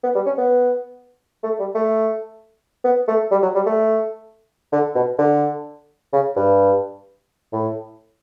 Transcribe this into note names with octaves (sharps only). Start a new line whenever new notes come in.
B3
G3
C#4
B3
A3
G3
A3
B3
A3
G3
F#3
G3
A3
D3
B2
D3
C#3
G2
A2